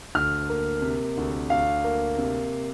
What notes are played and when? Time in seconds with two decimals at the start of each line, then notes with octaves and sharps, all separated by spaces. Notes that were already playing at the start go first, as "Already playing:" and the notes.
0.15 D2 F6
0.49 A#3
0.82 C3
1.17 D2
1.50 D2 F5
1.84 A#3
2.18 C3